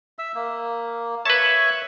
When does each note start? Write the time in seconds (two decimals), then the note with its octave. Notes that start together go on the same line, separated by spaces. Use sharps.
0.19 E5 E6
0.35 A#3
1.25 B4 C#5 E5 A5 C#6